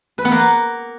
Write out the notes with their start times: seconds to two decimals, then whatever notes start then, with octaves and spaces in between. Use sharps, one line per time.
0.18 B4
0.25 B3
0.32 A#3